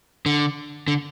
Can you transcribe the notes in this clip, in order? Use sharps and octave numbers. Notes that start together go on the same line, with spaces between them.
D3
D3